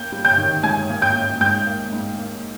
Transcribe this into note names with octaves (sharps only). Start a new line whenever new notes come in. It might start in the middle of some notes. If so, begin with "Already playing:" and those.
Already playing: A#3 G5 G6
G3
G5 G6
D#3
G#2 G#5 G#6
A#3
G5 G6
A#3
G#2 G5 G6
A#3
G#2
A#3